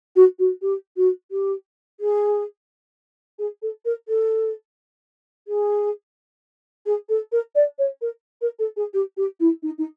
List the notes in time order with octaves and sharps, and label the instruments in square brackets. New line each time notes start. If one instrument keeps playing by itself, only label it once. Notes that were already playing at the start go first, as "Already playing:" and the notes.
[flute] F#4
F#4
G4
F#4
G4
G#4
G#4
A4
A#4
A4
G#4
G#4
A4
A#4
D5
C#5
A#4
A#4
A4
G#4
G4
G4
E4
D#4
D#4